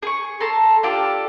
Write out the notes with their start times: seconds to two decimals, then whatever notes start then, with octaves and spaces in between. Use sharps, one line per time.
0.02 G#4 C#6
0.40 A4 A5 A#5 C6
0.83 D4 F4 G4 A4